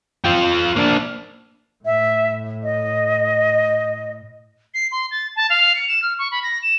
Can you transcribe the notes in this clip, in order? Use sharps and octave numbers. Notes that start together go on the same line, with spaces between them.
F4 G5
A#3 D4
A2 E5
D#5
C7
C6
A6
A5
F5
C#7
E7
F6
C#6
B5
A#6
E7